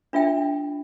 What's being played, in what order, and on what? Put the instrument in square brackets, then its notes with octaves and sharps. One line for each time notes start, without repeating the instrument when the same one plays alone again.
[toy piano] D4 F4 E5 G5